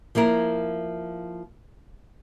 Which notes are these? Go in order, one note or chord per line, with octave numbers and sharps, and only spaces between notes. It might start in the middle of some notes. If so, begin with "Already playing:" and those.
F3 A#3 E4 A#4